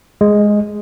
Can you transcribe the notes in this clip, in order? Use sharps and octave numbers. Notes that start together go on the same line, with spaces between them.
G#3